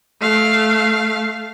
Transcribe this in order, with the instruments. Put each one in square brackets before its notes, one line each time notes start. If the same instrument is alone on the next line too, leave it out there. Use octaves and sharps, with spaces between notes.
[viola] A3 F5